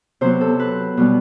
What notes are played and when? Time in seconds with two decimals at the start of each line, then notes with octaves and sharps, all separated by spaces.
0.21 C3 F#3 B3 C5
0.41 A4
0.60 B4
0.97 B2 G3 B3